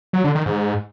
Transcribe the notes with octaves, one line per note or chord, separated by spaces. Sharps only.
F#3
D3
D#3
G#2